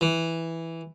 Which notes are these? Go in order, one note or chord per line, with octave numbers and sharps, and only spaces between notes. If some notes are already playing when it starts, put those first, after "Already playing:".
E3